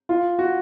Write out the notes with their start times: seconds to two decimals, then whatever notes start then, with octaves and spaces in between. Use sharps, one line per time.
0.09 F4
0.39 F#4